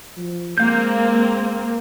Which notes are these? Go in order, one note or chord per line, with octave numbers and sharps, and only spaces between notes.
F3
G#3 A#3 C4 A#4 F5 G6